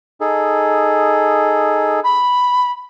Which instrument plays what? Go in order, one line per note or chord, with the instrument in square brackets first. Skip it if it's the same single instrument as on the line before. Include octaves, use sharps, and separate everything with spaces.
[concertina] D#4 G#4 A4
[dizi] B5